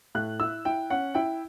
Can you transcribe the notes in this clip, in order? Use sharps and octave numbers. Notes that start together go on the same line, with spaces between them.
A2 F#6
E4 E6
E4 G5
C#4 F#5
E4 G5